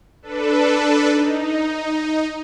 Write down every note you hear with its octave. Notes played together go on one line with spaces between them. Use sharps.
D4 A4 B4
D#4